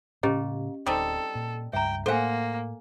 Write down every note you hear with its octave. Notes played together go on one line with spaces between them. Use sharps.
A2 C#3 A#3 C#4 G4 D#5
D1 G3 C4 D#4 A4
A#2
C#2 G2 E5 G5 A#5
A2 A#3 A4 C5 F5 F#5 G#5